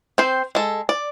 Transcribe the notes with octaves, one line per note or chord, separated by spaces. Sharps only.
C4 C5
G#3 A4
D5